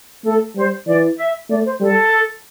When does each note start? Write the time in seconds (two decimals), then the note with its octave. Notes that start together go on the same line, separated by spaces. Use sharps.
0.25 A3 A4
0.56 G3 C5
0.87 E3 D5
1.18 E5
1.49 A3 D5
1.66 C5
1.80 G3 A4